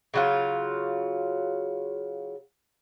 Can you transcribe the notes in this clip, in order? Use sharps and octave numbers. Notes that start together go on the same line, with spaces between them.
C#3 F#3 F4